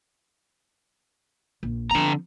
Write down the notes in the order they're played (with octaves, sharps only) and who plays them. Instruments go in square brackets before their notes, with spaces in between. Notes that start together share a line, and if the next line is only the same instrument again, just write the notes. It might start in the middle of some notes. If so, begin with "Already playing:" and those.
[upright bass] A#1
[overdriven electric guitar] D3 A#5 [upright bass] F3 C4